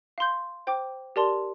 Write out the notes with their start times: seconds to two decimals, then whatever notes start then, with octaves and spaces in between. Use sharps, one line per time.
0.18 F5 C6 G6
0.67 C5 G5 D6
1.16 G4 A#4 D5 A5 C6